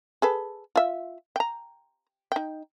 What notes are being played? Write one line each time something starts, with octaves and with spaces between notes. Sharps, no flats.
G#4 A4 B4
F4 E5
G5 A#5
D#4 G5